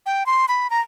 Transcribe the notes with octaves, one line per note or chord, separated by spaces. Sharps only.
G5
C6
B5
A#5